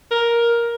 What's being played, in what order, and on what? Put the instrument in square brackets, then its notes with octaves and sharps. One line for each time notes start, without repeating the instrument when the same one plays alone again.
[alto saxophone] A#4